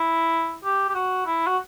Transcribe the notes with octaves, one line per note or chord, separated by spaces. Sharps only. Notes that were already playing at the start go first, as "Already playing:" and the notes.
Already playing: E4
G4
G4
F#4
E4
F#4